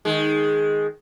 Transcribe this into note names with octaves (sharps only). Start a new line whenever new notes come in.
D#3 G#3